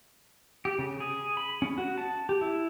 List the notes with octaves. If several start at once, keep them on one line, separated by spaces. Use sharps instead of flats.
G4
C#3
G#4
B5
C#4
F#4
A5
G4
E4